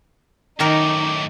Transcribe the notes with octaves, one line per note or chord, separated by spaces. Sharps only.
F#2 A2 D#3 D#4 A#4 D6